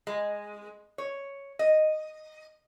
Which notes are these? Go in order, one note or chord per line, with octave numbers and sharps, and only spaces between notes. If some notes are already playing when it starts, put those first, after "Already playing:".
G#3
C#5
D#5